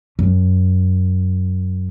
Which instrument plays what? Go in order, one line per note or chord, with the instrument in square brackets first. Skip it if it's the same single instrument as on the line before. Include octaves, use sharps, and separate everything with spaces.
[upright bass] F#2